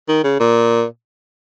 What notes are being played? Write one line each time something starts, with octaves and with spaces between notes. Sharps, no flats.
D#3
C#3
A#2